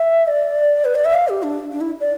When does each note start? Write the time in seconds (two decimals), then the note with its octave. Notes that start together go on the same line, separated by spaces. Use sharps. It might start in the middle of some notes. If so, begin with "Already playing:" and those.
Already playing: E5
0.28 D5
0.85 B4
0.95 D5
1.05 E5
1.14 F5
1.28 G4
1.43 D4
1.72 D4
1.81 E4
2.00 D5